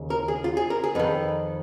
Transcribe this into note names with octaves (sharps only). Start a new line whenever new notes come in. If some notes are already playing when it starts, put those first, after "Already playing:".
Already playing: D#2 C#3
A#4
G#4
F4
G#4
A#4
G#4
F2 D#3 B4